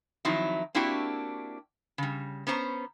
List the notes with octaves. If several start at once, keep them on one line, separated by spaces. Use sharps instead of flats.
D#3 F3 F#3 C4 D#4 E4
A#3 C4 D4 E4 F#4 G4
C#3 G3
B3 C#4 C5 A#5